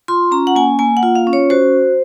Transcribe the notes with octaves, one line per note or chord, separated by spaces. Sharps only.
F4 C6
C#4 A#5
F#5
A#3 G#5
A#3 G#5
F#5
F4
F5
C#4
C#5
F#4 C5